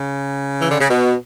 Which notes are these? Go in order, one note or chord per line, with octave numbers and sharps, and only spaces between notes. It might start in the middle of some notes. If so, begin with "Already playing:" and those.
Already playing: C#3
E3
D3
C#3
B2